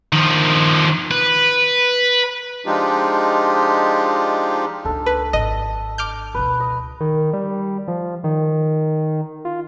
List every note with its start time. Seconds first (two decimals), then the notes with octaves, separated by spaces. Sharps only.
0.13 D#3 F3
1.11 B4
2.66 F3 G#3 D4 D#4 F4 G4
4.85 C#2 A#3 D4 A4
5.06 B4
5.33 G#1 D#5
5.98 D6 F6 G6
6.34 C#2 B2 B4
6.60 D#5
7.01 D#3
7.33 G3
7.88 F3
8.24 D#3
9.45 F4